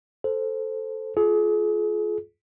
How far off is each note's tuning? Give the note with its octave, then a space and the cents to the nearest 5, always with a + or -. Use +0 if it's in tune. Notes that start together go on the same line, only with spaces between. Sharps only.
A4 +0 C5 +0
F4 +0 G#4 +40